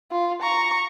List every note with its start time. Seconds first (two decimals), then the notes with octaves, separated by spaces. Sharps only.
0.12 F4
0.43 A#5 C#6